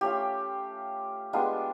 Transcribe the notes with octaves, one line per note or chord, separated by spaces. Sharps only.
A3 C#4 F4 G4
G#3 B3 D4 F4 G4